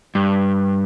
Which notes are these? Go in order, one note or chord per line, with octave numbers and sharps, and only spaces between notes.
G2